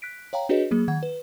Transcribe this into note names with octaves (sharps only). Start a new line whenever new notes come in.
F#6 B6 D7
C#5 F5 G5 A#5
D4 F#4 G#4 B4 C#5 D#5
F#3 A#3 G#4
D#3 F#5 G#6
B4